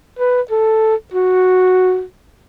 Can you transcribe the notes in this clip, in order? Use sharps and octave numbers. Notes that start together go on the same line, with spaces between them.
B4
A4
F#4